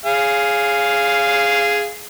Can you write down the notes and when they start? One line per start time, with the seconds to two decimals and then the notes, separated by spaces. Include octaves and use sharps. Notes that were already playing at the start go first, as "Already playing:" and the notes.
0.05 G#4 F5